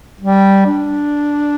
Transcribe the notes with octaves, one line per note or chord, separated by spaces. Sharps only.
G3
D4